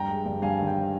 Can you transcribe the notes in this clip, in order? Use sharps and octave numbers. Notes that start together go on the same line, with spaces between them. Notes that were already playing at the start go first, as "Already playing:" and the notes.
Already playing: G2 G5 A#5
G#3
G2
G2 F5 G#5
D#3
G5